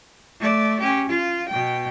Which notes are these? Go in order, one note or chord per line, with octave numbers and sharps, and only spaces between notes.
A3 D5
C#4 G4
F4
B2 G5